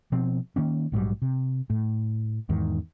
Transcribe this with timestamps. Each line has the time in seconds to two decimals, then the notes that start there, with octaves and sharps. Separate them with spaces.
0.12 B2 F3 C4
0.56 D#3 A#3 C#4
0.92 A#1 G#2 F#3 G3
1.22 C3
1.70 A2
2.49 E2 G#2 D#3